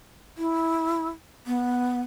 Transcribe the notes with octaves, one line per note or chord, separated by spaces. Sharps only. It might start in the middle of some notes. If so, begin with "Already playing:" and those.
E4
B3